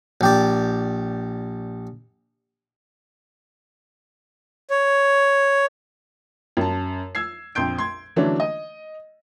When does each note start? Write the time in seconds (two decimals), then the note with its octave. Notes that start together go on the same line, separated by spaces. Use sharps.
0.21 A#1 G4 D5
4.70 C#5
6.57 F#2 A5
7.15 E6 G#6 C7
7.55 A#1 F2 C6 G6 D7
7.78 C6 G#6
8.16 D3 E3 F#3 A3 C#4 D4
8.40 D#5